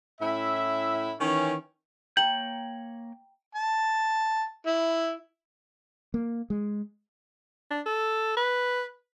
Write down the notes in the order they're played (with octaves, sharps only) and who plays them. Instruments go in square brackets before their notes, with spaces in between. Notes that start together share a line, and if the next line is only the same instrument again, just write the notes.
[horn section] A2 C#4 E4 E5
D#3 E3 C#4
[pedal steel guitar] A#3 C#5 G6 [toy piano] G5 A#5 [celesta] F#7
[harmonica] A5
E4
[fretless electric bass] A#3
G#3
[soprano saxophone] D4
A4
B4